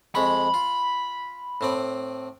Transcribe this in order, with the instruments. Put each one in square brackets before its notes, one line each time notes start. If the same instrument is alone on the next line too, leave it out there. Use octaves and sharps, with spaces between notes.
[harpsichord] F2 G#3 C#6 [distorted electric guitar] B5
[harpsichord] F4
A2 C4 D5